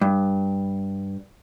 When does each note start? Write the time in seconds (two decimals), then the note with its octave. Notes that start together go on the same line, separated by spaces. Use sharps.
0.01 G2